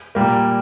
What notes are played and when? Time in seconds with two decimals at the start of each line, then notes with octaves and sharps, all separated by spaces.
0.15 A#2 G3 A#3